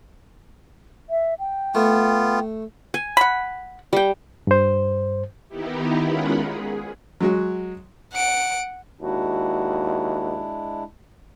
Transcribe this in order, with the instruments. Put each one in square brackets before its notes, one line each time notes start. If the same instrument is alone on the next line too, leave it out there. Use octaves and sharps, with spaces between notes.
[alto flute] E5
G5
[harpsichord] A3 [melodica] B3 F4
[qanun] G#5
[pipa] F#5 B5
[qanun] G3 G5
[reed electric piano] G2 C5
[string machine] D#3 B3 D#4 E4 G4
G#3 C#4 F4 A#4 F#5 B5
G#4
[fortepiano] F#3 G#3 F#4
[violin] F#5 D7
[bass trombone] D#2 [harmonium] G#3 D4 E4 [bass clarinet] F#4